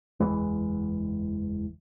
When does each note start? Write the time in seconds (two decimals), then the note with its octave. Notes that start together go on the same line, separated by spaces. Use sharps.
0.20 F#1 E2 E3 G#3